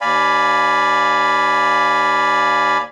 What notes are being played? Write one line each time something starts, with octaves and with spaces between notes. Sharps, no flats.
D#2 D5 F5 G#5 B5